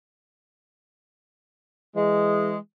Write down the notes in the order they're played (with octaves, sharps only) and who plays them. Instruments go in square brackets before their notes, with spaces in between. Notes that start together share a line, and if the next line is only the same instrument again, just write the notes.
[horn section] E3 G#3